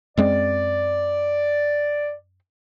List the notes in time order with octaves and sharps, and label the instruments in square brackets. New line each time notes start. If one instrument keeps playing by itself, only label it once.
[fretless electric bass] F#2 G#3 C4 [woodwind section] D5